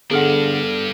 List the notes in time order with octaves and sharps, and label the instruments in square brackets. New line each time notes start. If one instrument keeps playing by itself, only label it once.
[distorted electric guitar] G2 D4 [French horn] D3 [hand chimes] B3 A4 F6 [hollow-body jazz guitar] G#4 F#5